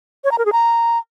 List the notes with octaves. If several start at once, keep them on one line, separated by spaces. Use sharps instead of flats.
C#5
A#5
A#4
G#4
A#5